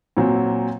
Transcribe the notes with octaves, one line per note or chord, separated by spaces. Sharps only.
A#2 F#3 C4